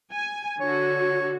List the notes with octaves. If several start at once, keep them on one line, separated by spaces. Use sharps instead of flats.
G#5
D3 F#4 C#5